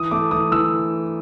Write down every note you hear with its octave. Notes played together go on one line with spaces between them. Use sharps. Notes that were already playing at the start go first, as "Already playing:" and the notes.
Already playing: E3 D#6
A3 D6
E3 D#6
E3 E6